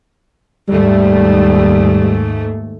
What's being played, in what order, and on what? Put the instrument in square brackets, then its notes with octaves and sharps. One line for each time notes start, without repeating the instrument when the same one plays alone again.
[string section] D#2 G#2 A3 [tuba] G3